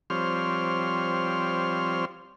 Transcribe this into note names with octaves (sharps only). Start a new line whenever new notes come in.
F3 G3 C4 C#5 C6 F6